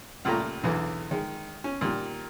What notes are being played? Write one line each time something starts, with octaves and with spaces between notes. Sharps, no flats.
C#2 A#2 G3 A3 G4 A#5
B1 E2 D3 E3
D#3 G#3
C#4
A#2 D#3 G3